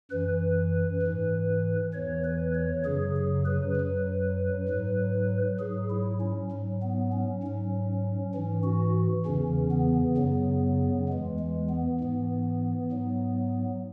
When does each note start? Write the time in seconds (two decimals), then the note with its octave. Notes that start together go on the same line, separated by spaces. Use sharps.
0.11 F#2 E3 B4
1.02 E3
1.07 G#2
1.93 E2 E3 C#5
2.24 B4
2.54 C#5
2.85 F#2 C#3 F#3 G#4
3.16 G#4
3.46 B4
3.77 F#2 F#3
4.69 G#2 F#3
5.59 G#2 F#3 G#4
5.90 E4
6.20 C#4
6.51 G#2 F#3
6.82 B3
7.12 C#4
7.43 G#2 F#3 C#4
8.34 G#2 E3 C#4
8.64 F#4
9.25 E2 C#3 E3 C#4
9.71 B3
10.17 F#2 C#3 F#3 B3
11.09 E2 E3 G#3
11.39 G#3
11.69 B3
12.00 G#2 E3
12.92 G#2 F#3